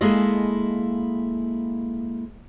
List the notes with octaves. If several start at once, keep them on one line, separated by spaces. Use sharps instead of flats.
G#3 A#3 E4 G#4 A4 D#5